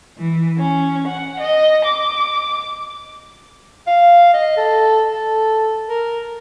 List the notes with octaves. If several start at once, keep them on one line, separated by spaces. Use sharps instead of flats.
E3
C#4
F#5
D#5
D6
F5
D#5
A4
A4
A#4